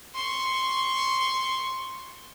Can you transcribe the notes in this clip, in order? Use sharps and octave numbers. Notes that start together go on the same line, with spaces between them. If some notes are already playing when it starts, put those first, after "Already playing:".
C6 C#6